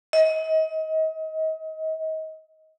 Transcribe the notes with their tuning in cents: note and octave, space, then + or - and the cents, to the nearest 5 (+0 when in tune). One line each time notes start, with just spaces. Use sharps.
D#5 +35